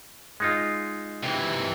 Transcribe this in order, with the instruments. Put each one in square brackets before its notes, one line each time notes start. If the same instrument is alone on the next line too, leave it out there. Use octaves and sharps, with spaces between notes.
[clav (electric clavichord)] G#3 D#4 F4
[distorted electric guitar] C3 E3